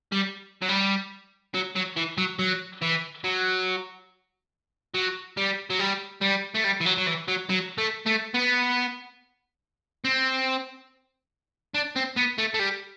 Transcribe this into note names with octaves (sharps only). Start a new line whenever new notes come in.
G3
F#3
G3
F#3
F#3
E3
F#3
F#3
E3
F#3
F#3
G3
F#3
G3
G3
A3
G3
E3
F#3
F#3
E3
F#3
F#3
A3
A3
B3
C4
D4
C4
B3
A3
A3
G3